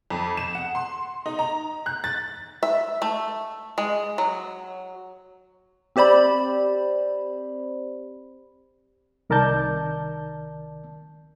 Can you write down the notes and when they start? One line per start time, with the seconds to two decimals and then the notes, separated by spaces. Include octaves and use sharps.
0.10 F2
0.37 E7
0.55 F#5
0.75 C6
1.26 D#4
1.39 A#5
1.86 F#6
2.04 A6
2.63 E5
3.02 A3
3.78 G#3
4.18 F#3
5.96 C4 G4 C5 D5 B5
9.30 C2 D#3 A#4 D5 A5 G6